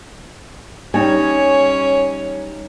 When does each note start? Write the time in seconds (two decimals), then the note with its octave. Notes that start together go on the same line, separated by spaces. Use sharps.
0.94 G3 C#4 D#4 C#5 G#5